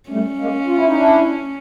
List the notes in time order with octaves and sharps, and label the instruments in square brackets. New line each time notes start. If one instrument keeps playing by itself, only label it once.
[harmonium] G3 A3 [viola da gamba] C#4
[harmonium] G#3 A#3
F4
E4
D#4
D4 E4